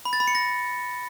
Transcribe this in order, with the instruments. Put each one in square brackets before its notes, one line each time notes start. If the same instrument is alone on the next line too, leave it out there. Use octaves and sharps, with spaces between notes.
[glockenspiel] B5
A6
B5
C#7
A#6